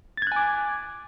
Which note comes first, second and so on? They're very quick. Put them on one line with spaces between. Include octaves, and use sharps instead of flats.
A6 G#6 F#6 G#5 D6